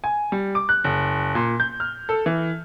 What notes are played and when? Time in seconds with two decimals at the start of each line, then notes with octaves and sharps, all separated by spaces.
0.04 G#5
0.32 G3
0.55 D6
0.69 F#6
0.84 F#1
1.35 A#2
1.60 G6
1.80 F6
2.09 A4
2.26 E3